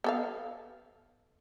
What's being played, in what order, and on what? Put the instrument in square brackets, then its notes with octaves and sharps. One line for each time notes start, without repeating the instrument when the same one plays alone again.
[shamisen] B3 A4 F5